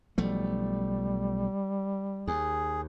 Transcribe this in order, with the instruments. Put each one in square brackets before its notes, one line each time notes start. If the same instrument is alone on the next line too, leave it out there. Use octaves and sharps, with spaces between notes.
[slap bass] B1 F3 A3 [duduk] G3
[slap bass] D#2 [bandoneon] G#4